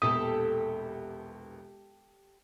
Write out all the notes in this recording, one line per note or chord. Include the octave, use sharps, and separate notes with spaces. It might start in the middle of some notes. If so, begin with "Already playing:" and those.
E1 A#1 B3 G4 A4 D#6